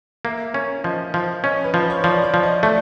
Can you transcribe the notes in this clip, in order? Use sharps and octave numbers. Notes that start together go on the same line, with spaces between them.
A#3 E5
C#4 A#4
F3 D#5
F3
C#4 D#5
B4
F3 C5
C#5
F3 D5
D5
F3
D#5
A3 D5